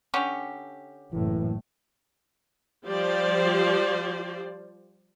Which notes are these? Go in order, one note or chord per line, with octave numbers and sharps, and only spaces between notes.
D3 C#4 G4
F#1 A2 E3
F3 G3 F4 G4 C5 D5